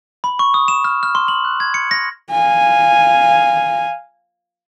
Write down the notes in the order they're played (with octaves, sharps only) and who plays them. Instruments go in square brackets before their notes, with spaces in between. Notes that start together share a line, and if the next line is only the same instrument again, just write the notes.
[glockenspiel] B5
C#6
D#6
E7
F6
F6
C6
F#7
F#6
G#6
C#7
A#6
[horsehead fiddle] F5 G#5